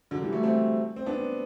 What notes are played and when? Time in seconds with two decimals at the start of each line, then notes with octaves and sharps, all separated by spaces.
0.11 D3 F#3
0.22 E3 G3
0.32 F#3 A3
0.43 A3 C4
0.96 C4
1.06 B3 D4